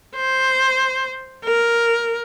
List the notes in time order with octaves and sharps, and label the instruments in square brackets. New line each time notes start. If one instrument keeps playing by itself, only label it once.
[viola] C5
A#4